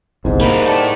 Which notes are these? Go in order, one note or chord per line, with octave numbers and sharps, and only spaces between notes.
G1 C2 G#2
G3 A#3 A#4 B5
E4 A4 D5